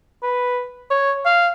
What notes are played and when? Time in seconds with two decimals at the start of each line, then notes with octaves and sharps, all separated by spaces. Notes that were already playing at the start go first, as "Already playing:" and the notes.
0.23 B4
0.91 C#5
1.25 F5